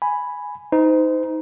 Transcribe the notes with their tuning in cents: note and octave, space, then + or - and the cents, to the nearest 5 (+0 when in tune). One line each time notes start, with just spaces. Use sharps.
G#5 +0 B5 +0
D#4 +15 C5 -35